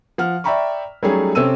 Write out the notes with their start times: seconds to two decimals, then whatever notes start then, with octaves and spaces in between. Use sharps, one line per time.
0.18 F3 F#5 F6
0.44 D5 E5 G5 A#5 B5 C#6
1.03 F#3 G3 A3 C#4 D#4 G#4
1.35 C3 C4 C#4 A4 E6 D#7